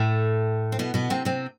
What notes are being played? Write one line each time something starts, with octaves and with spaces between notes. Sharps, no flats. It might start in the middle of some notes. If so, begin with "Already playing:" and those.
Already playing: A2 A3
C4
B2 B3
B2 B3
C3 C4
C3 C4